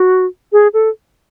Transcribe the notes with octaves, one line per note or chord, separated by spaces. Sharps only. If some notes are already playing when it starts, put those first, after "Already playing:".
Already playing: F#4
G#4
A4